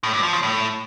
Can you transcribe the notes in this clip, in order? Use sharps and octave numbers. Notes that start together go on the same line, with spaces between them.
A2
G2
F3
C#3
A2